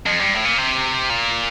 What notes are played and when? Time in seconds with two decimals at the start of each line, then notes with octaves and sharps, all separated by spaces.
0.06 F2
0.19 G2
0.32 A2
0.45 A#2
0.58 C3
1.10 A#2